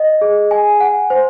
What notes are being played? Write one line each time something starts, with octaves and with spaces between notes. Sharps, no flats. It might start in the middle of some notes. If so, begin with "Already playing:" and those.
Already playing: D#5
G#4
G#5
F#5
C5